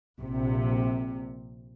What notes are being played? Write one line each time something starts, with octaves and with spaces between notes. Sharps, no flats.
A#1 C3